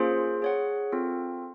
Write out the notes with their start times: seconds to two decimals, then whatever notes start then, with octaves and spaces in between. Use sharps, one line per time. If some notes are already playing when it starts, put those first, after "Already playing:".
Already playing: A#3 C#4 F4 G#4 C5
0.42 G#4 C#5 F#5
0.92 C4 F4 A4